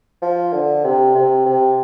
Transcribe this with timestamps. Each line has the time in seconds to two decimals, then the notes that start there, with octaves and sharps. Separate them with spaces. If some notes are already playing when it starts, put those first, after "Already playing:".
0.22 F3
0.52 D3
0.84 C3
1.15 C3
1.46 C3